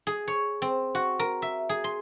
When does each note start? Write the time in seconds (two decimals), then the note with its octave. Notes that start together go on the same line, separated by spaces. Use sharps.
0.07 G#4
0.28 C#5
0.62 C4
0.95 F#4
1.19 A#4
1.42 E5
1.69 G#4
1.84 C6